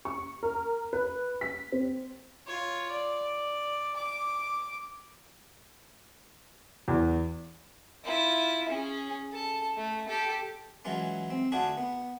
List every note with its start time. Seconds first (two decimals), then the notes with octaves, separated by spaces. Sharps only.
0.05 C#6
0.43 A#4
0.93 B4
1.41 B6
1.72 C4
2.47 F4 C#5
2.91 D5
3.96 D6
6.88 E2
8.05 E4 F4
8.69 C#4 G#4
9.32 A4 A5
9.77 A3
10.08 G4 A4
10.85 E3 F#3 G#3 C#4 F4
11.30 C4
11.52 D3 A3 D4 F4 F#4 G#4
11.77 B3